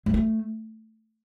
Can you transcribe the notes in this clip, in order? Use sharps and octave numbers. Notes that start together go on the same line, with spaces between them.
G#3
A3